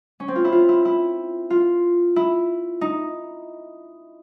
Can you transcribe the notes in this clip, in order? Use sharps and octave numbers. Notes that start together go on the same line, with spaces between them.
C#4
C4
F4
E4
F4
E4
E4
F4
E4
D#4